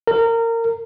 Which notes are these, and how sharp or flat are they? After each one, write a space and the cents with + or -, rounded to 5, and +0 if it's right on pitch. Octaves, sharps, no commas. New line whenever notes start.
A#4 -25